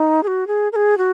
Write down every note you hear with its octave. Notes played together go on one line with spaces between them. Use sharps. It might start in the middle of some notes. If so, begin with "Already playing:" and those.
Already playing: D#4
G#4
F#4
G#4
A#4
G#4
F#4